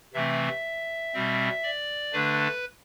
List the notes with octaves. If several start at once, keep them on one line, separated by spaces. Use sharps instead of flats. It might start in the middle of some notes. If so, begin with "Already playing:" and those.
C3 E3 A3 C4 E5
B2 G3 C4
D5
D3 A3 D4 B4